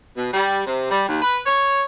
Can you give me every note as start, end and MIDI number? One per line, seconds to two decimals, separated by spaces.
0.16 0.30 47
0.34 0.64 55
0.66 0.89 48
0.90 1.06 55
1.09 1.21 39
1.22 1.39 71
1.46 1.84 73